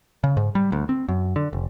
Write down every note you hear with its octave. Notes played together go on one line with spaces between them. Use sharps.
C#3
G#2
G3
D2
C4
F#2
D3
F1